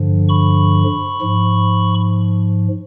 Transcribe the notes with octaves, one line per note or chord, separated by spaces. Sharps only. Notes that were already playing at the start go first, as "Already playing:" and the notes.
Already playing: G2 D3 F3
B5 C#6
G#2 F3